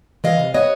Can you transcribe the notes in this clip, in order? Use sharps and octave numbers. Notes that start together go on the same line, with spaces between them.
E3 D#5 F5
C3
B3 C#5 D#5